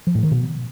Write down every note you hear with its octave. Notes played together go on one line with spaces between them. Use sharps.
F3
A2
D#3
B2